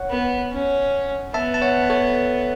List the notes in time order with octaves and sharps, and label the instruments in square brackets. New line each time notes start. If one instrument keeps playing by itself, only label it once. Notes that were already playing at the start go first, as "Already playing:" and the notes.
Already playing: [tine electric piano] C#5 F#5
[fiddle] B3
C#4
[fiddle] B3 [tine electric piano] E5 A5
[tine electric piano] A5
C#5 F#5
A4 C#5